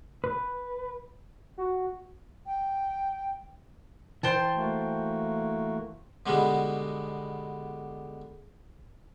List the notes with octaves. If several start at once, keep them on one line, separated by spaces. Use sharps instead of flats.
B4
F#4
G5
E3 C5 G5 A5
A3 A#3 F#4
B2 D3 G3 G#3 B3